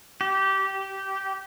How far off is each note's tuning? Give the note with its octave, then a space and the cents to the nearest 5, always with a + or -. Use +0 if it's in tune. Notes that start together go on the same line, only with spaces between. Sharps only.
G4 -20